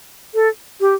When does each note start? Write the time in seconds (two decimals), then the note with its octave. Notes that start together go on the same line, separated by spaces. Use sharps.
0.34 A4
0.81 G4